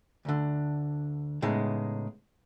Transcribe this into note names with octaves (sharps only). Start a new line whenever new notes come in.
D2 D3
A2 C#3 G#3 B3 D#4